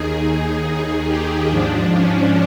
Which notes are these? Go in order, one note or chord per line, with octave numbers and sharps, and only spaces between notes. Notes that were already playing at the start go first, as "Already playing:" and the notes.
Already playing: D#2 D#3 G#4
G4
G#2 F3 D4
C#4